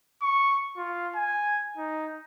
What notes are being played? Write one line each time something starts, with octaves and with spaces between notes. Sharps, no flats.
C#6
F4
G#5
D#4